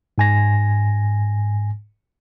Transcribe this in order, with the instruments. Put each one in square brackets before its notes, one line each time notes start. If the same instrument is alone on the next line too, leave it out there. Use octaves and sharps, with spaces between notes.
[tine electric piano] G#2 G#5 A#6